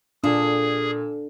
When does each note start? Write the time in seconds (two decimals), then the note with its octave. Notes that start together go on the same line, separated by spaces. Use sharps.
0.24 A#2 D4 G#4 A4